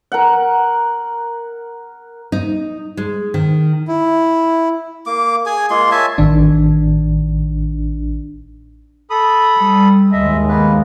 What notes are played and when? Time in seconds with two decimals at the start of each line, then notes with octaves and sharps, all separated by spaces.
0.12 A#4 F#5
2.32 D#4
2.97 G#3
3.34 D#3
3.88 E4
5.06 A#3 D6
5.46 G#4 G#5
5.70 G#3 A#3 F4 C6
5.91 C#5 E5 G#5 A5
6.18 A1 D#3 D4
9.10 A4 B5 D#6
9.54 G3
10.12 D#2 G#3 D#5 E5
10.48 A#3 B3 B4